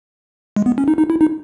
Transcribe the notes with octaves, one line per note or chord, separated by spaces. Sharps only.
G#3
B3
C#4
D#4
D#4
E4
D#4